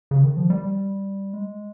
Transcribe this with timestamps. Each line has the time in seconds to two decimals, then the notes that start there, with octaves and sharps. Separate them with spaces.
0.11 C#3
0.23 D#3
0.37 F3
0.50 G3
1.33 G#3